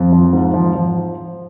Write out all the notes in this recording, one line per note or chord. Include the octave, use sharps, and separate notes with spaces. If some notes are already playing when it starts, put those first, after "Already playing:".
Already playing: F2
F3
G#2
F3
F3